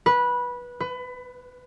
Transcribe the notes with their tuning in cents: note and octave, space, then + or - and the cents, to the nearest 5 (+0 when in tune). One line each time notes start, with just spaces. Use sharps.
B4 -15
B4 +25